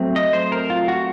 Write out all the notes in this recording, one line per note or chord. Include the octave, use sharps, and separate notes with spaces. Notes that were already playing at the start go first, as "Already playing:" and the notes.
Already playing: F#3 A3 C4
D#5
C5
A#4
F4
F#4